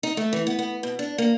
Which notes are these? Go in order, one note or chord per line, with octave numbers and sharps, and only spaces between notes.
D#4
A3
E3
B3
B3
B2
D4
A#3